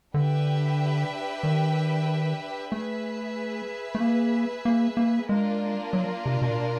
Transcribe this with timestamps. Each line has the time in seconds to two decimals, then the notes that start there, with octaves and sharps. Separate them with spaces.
0.14 D3 D4 G4 B4 E5 G5
1.43 D#3
2.72 A3 G#4 B4 E5
3.95 A3
4.00 A#3
4.65 A#3
4.97 A#3
5.29 G#3 A#3 D4 F4 A#4
5.93 F#3
6.26 C3
6.42 B2
6.50 A#2
6.58 B2